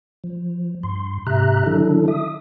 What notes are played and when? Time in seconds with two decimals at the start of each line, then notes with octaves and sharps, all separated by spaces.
0.24 F3
0.83 G2 C6
1.27 G#2 C3 G4 E5 A#5 F#6
1.66 D3 D#3 F#3 D4 E4 A4
2.08 E5 D#6